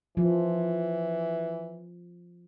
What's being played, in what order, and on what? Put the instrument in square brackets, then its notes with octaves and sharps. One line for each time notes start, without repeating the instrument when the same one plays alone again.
[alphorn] E3 [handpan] F3